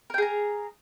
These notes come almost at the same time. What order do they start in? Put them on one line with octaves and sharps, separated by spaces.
A#4 G5 G#4 A#5